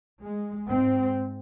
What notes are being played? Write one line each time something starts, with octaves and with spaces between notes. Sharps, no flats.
G#3
G#2 C4